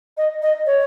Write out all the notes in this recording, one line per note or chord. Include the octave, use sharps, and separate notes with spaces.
D#5
D#5
C#5